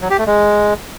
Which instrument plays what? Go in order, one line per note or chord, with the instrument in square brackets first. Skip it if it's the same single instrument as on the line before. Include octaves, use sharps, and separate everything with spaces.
[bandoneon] F#3
G4
A3
G#3